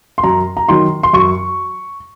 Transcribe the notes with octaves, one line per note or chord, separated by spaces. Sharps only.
C6
F#2 A#5
A#5
D#3 F#3 C6
C6
F#2 C#6